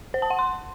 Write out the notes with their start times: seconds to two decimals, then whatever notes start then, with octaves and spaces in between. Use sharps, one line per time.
0.14 C5
0.22 A5
0.30 F#5
0.39 C6